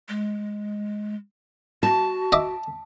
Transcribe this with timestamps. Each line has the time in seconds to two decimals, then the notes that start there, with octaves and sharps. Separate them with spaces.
0.09 G#3
1.83 F#4 A5
2.32 D#5 E5 D6